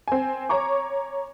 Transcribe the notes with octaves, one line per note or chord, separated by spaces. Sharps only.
C4 G#5
C#5 A#5 C#6 D6